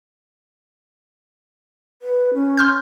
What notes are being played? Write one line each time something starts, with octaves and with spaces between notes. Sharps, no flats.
B4
C#4
C6 F6 G6